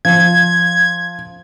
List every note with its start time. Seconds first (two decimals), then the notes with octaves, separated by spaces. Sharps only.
0.05 F3 G#6